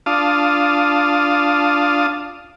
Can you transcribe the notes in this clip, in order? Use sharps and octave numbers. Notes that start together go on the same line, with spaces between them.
D4 F4 F5 A5 D#6